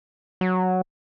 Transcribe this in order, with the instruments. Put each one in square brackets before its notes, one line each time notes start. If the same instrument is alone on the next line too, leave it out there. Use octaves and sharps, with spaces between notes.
[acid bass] F#3